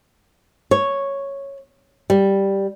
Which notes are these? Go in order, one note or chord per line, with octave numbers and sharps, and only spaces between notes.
C#5
G3